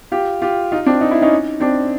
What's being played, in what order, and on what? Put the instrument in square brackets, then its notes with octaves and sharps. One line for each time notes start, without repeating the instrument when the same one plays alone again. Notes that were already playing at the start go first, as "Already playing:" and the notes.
[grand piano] F4 G4
F4 G4
D#4 F4
C4 D4
D#4
E4
C#4 D#4
C4 D4